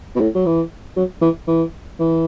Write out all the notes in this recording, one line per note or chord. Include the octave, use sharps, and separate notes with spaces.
B2
A2
F#3
E3
F#3
E3
E3
E3